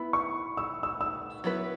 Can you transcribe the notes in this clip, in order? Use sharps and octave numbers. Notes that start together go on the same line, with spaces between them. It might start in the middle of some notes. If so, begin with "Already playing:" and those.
Already playing: B3 E4 B5
C#6
E6
E6
E6
F#3 B3 E4 B4